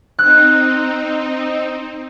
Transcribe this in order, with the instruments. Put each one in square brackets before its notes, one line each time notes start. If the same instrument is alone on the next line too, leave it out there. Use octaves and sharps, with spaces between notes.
[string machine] C4 D#4 [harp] F#6